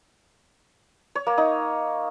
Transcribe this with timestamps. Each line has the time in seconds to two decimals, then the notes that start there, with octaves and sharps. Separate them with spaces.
1.15 C#5
1.27 A#3
1.38 D#4